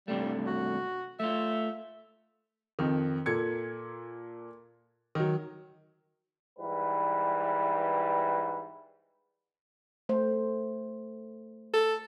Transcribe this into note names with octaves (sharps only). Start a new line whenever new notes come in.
G2 C3 G3 A3
F#4
A3 F4 E5
F2 D#3
A#2 A4 G#6 C#7
D#3 F#3
G#2 E3 G3 B4
A3 C5
A4